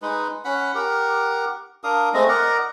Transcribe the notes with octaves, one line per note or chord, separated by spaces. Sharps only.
G#3 D#4 B4
C#4 F#5 B5
G4 A#4 F#5
D4 A#4 F5 D#6
G#3 A3 C4 D#5
A#4 D5 D#5 F#5